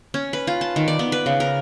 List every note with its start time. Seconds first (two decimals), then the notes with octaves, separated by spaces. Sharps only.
0.14 C#4
0.33 B4
0.47 F4
0.61 A5
0.76 D#3
0.88 D5
0.99 B3
1.12 B4
1.26 C#3
1.40 A#4